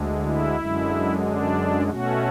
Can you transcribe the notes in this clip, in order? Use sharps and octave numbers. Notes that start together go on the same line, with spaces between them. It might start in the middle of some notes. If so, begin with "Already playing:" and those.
Already playing: D2 D3 G#3
E4
F#2 D3 G#3
D4
B2 A3 C#4 F#4